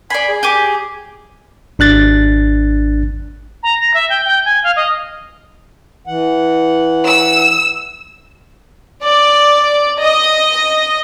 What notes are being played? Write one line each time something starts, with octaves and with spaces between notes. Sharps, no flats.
D5 G#5 B5 C6
G#4
G4 G#5 D6
G#1 D4 F#6 A6
A#5
A#6
E5
G5
G5
G#5
F5
D#5
E3 F#5
E6
D5
D#5